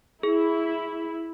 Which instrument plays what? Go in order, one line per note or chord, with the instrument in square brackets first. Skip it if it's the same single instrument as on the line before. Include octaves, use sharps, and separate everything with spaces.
[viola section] E4 [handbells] G#4